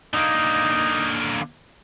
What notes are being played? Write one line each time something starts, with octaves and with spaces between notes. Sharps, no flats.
D3 A#3 D#4